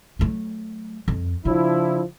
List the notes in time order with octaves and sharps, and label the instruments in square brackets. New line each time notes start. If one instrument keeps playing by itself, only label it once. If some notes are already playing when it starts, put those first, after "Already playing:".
[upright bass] F#3 A3
F2
[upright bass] C#3 [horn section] F3 D4 E4